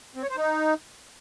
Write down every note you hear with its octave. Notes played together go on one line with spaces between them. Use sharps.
C4
C#5
C5
D#4